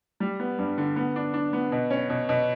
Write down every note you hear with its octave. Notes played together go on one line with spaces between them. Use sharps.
G3
B3
G2
D3
B3
D4
D4
B3
B2
C#4
B2
B2